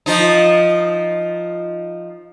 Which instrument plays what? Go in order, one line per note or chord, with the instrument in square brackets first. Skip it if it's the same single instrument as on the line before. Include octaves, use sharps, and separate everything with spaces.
[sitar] F3 D#4